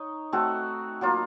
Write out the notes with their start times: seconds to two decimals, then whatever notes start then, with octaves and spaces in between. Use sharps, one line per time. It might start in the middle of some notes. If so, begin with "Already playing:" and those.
Already playing: D#4 C#5
0.32 A3 C4 F#4 A4
1.01 F#3 A#3 F4